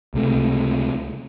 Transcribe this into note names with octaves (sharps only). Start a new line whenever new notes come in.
C#2 C3 A3